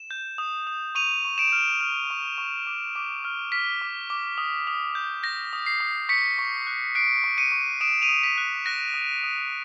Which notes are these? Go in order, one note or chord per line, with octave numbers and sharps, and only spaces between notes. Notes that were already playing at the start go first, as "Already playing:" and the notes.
Already playing: E7
G6
D#6
D#6
C#6 D#7 F7
C#6
D7 E7
F6
F6
C#6
C#6
D6
D6
F6
F6 B6
D6
D6
D#6
D#6
G6
G6 A#6
D#6
C7
D#6
C#6 B6 C#7
C#6
F#6
F#6 C7 D7
C#6
C#7 D#7
C#6
D#6 D7 E7
D#7 F7
D#6
B6
F#6
F#6 A#6
D#6
D#6